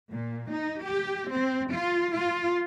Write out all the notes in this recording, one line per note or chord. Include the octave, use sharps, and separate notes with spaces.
A#2
D#4
G4
C4
F4
F4